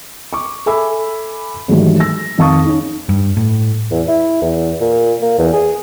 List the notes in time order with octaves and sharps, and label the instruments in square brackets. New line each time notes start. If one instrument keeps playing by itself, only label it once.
[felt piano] C#6 D6
A4 E5 G#5 B5 D6 E6
G#2 D#3 E3 F#3 G3 A3
E6 A#6
F2 D#3 F5 A5 C#6 D#6
C#4 D#4
[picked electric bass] G2
A2
[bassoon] E2
E4
E2
A#2
A#3
E2
G#4